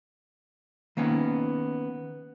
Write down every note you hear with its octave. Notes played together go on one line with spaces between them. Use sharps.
D#3 A#3 B3 C#4 D#4